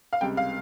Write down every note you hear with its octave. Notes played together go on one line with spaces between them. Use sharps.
F5
C#2 C3 G3 G5
F5